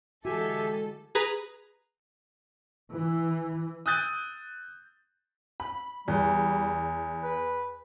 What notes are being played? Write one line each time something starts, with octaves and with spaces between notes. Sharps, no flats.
D3 E3 G#3 F#4 G4 A4 E5 G#5
G#4 B4 A#5
E3
D#6 E6 F#6 G6 A6 D#7
B5
E2 G3
B4